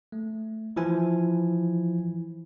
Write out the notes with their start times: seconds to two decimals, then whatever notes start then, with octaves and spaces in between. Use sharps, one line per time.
0.12 A3
0.76 E3 F3 E4 G#5